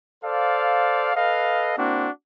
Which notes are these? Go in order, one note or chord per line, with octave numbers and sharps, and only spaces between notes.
A4 C5 D5 F5
A4 B4 D#5 F5
A#3 C4 D4 E4 F#4